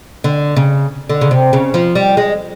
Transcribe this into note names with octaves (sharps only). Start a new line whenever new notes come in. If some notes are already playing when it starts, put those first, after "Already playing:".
D3
C#3
D3
C#3
C3
C#3
F3
G3
G#3